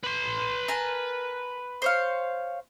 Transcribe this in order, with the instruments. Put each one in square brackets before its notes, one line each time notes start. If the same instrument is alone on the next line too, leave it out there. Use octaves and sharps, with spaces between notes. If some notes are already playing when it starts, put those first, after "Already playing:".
[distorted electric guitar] B4 C6
[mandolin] A#4 G#5 A5
C5 C#5 F5